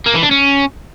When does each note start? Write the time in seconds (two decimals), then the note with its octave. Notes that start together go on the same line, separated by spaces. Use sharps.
0.06 A#3
0.14 E3
0.23 D4
0.31 C#4